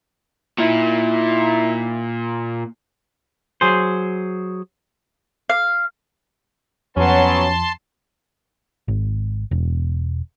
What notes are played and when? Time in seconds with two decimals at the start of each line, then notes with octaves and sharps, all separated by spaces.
0.58 A#2 D#4 E4
3.61 F#3 G#4 C5
5.50 F5
6.96 F2 F#3 B3 C#4 A5 C6
8.88 G#1
9.51 E1